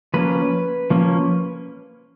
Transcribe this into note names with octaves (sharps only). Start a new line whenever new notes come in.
F3 A#3 C#4 B4
F3 A#3 C#4